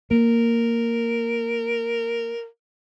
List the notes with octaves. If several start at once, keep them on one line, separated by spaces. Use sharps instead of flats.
A#3 A#4